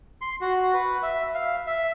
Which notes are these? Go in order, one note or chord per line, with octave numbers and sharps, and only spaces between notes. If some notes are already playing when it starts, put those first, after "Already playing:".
C6
F#4
B4
E5
F5
E5